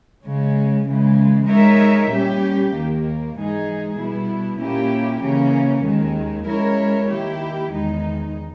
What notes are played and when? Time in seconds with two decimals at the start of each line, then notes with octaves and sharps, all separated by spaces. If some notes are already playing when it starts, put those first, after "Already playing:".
0.25 C#3 G#3 C#4
0.87 C#3 E3 G#3
1.49 G#3 D#4 A#4 C#5 E5
2.11 A#2 G3 C#4 G4
2.73 D#2 D#3 A#3
3.36 G#2 E3 G#3 D#4 G#4
3.98 B2 G3 B3 E4
4.61 A#2 A#3 C#4 E4 G4
5.22 C#3 E3 A#3 C#4
5.85 D#2 D#3 G#3
6.47 G#3 C#4 E4 A#4 C#5
7.10 D#3 A#3 E4 G4
7.72 E2 D#3 G#3 D#4